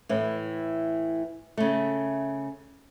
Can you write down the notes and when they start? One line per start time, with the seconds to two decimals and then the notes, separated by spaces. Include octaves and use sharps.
0.09 A2 E3
1.57 C#3 A3